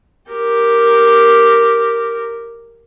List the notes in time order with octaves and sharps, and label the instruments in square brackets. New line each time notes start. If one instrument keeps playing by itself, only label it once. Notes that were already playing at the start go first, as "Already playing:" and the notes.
[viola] G4 A#4